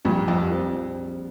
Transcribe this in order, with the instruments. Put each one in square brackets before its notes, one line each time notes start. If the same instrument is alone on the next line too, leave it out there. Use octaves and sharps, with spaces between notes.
[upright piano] A#1 [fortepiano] G2 A#2
[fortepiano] F2 [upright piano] G3
[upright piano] C4